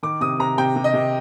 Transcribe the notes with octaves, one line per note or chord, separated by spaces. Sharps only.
D#3 D6
C3 D#6
C3 A#5
C3 G5
C3
D#5
C3